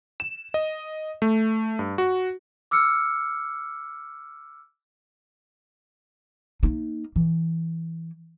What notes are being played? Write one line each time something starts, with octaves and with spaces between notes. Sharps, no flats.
E7
D#5
A3
G2
F#4
D6 E6 F6 C#7
A#3 D#4
E3